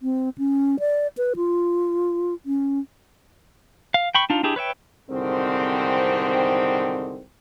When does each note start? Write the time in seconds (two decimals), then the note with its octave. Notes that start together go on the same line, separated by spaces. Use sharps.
0.02 C4
0.38 C#4
0.80 D5
1.17 B4
1.36 F4
2.46 C#4
3.94 F5
4.15 G5 B5 C#6
4.30 D4 D#4 F4
4.43 D4 E4 G4 G#4
4.56 B4 C#5 E5 G5
5.10 C2 G#2 D3 D#3 C4